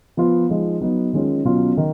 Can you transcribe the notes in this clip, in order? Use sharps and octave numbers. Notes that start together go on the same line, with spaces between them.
F3 B3 F4
F3 G#3 D#4
F#3 B3 D#4
D#3 G#3 C#4 F4
B2 F#3 C#4 F4
D#3